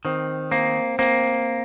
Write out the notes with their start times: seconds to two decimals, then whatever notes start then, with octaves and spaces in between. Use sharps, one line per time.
0.05 D#3 C4
0.51 A#3 C4
0.99 A#3 C4